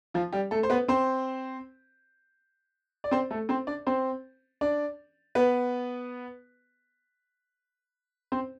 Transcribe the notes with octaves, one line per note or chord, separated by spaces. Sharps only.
F3 F4
G3 G4
A3 A4
C5
B3 B4
C4 C5
D5
C4 C5
A3 A4
C4 C5
D4 D5
C4 C5
D4 D5
B3 B4
C4 C5